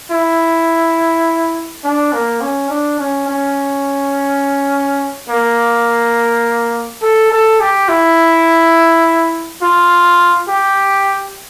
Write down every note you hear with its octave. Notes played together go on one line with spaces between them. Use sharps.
E4
D4
A#3
C#4
D4
C#4
C#4
A#3
A4
A4
G4
E4
F4
G4